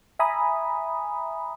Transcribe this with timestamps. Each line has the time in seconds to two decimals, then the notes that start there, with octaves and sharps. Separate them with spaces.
0.19 E5 G#5 A#5 B5 D#6